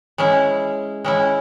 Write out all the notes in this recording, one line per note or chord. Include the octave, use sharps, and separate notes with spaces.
G#3 C#4 E4
G#3 C#4 E4